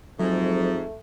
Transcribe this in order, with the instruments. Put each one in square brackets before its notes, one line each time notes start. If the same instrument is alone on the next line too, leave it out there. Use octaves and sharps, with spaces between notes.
[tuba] F2 [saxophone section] G#2 [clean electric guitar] F#3 [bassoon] A3